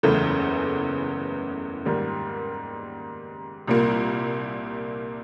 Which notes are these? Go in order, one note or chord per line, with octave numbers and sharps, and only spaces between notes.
F#1 E2 C#3 E3 A3
G#2 D#3 G3 A#3
C2 A#2 G3 A#3